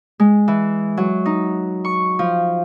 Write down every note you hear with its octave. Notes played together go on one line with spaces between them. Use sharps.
G#3
E3
F#3
D#4
C#6
F3